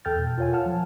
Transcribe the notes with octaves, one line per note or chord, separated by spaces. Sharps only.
E2 A4 G5 F6 G6 A6
B2
F4 A#4 C#5 F5 G#5
F#5 A5 F6
F3